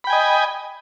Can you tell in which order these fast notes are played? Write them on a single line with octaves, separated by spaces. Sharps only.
B5 G5 G#5 D#5